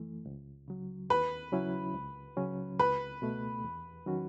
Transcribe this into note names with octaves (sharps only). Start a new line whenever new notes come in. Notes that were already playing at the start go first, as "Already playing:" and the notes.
Already playing: F#2 E3 A3
C#2
C#3 F#3
D#2 B4
C#3 F#3 C#4 E4
C#2
C#3 F#3 C#4
C#2 B4
B2 A3
E2
D#3 F#3 C#4 F#4